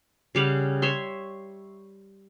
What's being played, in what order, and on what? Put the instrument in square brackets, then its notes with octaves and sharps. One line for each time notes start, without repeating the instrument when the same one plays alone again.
[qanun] C#3 G3 F5 F#5
C#5 E5 C6